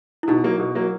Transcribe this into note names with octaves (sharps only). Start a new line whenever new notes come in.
E4
B2 D#4
F#3 A#3
B2
F#3 A#3